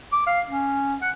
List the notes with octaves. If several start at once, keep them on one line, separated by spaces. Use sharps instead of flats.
D6
F5
C#4
F#5